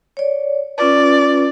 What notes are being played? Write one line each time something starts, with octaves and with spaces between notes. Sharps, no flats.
C#5 D5
C#4 F4 B4 D5